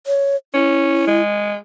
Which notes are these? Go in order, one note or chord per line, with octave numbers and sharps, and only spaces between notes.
C#5
C#4 E4
G#3